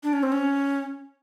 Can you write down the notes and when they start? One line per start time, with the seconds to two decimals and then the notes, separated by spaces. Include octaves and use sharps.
0.03 D4
0.13 C#4
0.23 C4
0.32 C#4